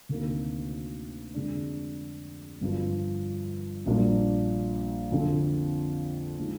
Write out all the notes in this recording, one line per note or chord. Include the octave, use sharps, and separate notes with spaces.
D2 C3 D#3 A#3 D4
F2 D3 G#3 D4
G1 G2 F3
A#1 A#2 G3 A#3 D4
F2 D3 F3 C4
F3 G#3 D#4